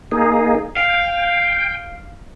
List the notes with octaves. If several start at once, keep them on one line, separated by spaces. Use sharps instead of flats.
A#3 D#4 G#4
F5 G5